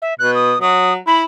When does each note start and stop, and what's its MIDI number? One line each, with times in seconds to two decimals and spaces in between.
0.02 0.14 76
0.19 0.54 47
0.19 0.31 90
0.35 0.59 87
0.61 0.97 54
0.61 0.93 87
1.07 1.23 64
1.07 1.22 83